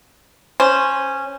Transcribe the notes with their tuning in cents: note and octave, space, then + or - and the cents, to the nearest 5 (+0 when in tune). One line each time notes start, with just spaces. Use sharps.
C#4 -10 C5 +0